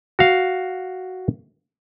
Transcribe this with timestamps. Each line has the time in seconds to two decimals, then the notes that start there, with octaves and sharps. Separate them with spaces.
0.19 F#4 F5